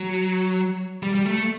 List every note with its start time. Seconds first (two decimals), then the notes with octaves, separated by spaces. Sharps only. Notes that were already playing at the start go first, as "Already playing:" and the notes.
Already playing: F#3
1.03 G3
1.15 G3
1.26 A3